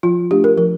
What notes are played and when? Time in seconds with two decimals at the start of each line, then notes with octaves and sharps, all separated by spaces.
0.03 F3 F4
0.31 A3 D4 G4
0.44 A#4
0.57 F3 A#4